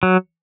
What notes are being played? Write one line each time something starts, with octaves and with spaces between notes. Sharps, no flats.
F#3